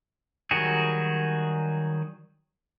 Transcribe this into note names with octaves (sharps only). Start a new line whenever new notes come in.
D#3 F#3 G3 F#4 G#4